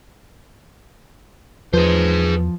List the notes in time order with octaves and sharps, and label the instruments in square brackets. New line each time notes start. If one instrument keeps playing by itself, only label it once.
[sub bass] E2 [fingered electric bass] F3 [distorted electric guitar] G#4 C5 [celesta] B4